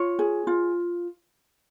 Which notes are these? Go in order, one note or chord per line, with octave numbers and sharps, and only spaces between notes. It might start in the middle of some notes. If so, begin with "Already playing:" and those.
Already playing: F4 C#5
G#4
F4